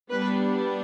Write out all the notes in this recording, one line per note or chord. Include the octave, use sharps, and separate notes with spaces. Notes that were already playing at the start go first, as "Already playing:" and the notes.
G3 B3 D4 B4